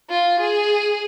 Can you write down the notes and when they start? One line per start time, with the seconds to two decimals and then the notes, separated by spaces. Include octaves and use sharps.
0.10 F4
0.40 G#4